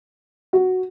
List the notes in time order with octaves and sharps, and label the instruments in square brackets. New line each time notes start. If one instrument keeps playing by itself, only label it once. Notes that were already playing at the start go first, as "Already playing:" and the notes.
[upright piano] F#4